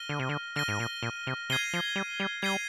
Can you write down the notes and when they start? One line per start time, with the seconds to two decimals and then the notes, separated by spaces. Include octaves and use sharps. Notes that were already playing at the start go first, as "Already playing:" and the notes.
Already playing: F6 A#6 D#7 G7
0.09 D3
0.19 C3
0.29 D3
0.56 D3 F6 A#6 D#7 G7
0.68 G#2
0.80 A#2
1.03 A#2
1.27 C3
1.50 C3 G#6 C7 D#7 G7
1.73 F3
1.96 G3
2.20 G3
2.42 G3 G#6 C7 D#7 G7